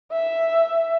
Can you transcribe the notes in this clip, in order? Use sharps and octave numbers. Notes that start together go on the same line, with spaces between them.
E5